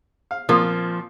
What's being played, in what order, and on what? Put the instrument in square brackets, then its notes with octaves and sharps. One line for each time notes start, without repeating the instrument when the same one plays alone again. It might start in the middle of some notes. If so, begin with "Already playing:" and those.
[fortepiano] F5
[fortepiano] A#2 A#3 C4 [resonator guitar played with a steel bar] F3